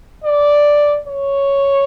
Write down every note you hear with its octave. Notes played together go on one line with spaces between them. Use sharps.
D5
C#5